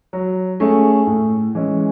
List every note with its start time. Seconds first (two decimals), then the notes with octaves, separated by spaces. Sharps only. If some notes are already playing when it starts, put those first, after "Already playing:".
0.13 F#3
0.60 A3 C#4 G#4
1.07 A2
1.55 E3 G#3 C#4